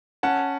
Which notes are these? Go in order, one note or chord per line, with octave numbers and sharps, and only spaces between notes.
C#4 F#5 A5